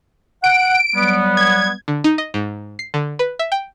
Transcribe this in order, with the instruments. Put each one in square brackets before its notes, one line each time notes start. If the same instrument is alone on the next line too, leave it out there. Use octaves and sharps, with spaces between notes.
[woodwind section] F#5 [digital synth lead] D7
[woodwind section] F#3 G3 B3
[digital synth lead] G#6
[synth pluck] D3
D#4
D#5
G#2
C7
D3
B4
E5
G5